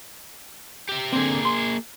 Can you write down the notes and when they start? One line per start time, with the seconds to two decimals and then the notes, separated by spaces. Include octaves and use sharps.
0.89 G4 E5
1.13 D3 A#3 C4 G#4
1.45 C6